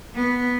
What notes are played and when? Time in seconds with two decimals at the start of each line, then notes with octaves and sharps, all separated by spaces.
0.15 B3